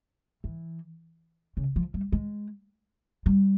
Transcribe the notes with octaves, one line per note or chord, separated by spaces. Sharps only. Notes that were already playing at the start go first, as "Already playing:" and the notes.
E3
C#3
F3
G3
G#3
G3